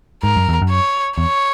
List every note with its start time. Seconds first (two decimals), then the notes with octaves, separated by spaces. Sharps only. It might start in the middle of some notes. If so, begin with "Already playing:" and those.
0.23 G#2 A#4
0.36 F#2
0.49 E2
0.62 F#2
0.70 C#5
1.18 E2 C#5